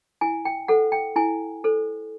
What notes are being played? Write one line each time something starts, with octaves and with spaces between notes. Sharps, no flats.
E4 G#5
G5
A4 C5 F#5
G5
E4 G#5
A4 C5